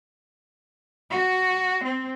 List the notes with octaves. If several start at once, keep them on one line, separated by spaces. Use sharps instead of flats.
F#4
C4